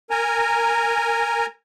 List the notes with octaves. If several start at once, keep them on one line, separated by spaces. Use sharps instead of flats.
A#4 G#5 A#5